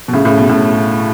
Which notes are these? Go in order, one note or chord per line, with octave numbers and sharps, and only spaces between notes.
B2
A2 C#3
A2 C#3
B2
A2